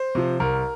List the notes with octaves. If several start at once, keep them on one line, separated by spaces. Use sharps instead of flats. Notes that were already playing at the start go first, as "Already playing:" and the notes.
Already playing: C5
C3 F3
C2 A#4